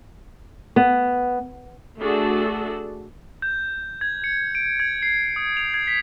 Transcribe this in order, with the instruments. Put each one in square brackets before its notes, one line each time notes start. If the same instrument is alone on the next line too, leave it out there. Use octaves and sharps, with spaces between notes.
[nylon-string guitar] B3
[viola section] A3 D4 F#4 G#4 A4
[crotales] G6
G#6
C#7
D7
G#6
C7
D#6
F7
G#6
B6